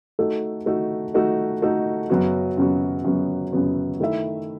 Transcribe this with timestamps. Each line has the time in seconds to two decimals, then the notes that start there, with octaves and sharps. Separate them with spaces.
0.19 A3 D#4 F#4 A4
0.66 A3 D#4 F#4 A4
1.14 A3 D#4 F#4 A4
1.62 A3 D#4 F#4 A4
2.10 F#2 C#3 F#3 B3 F#4
2.57 F#2 C#3 F#3 B3 F#4
3.05 F#2 C#3 F#3 B3 F#4
3.52 F#2 C#3 F#3 B3 F#4
4.00 D#3 A3 E4 A4 E5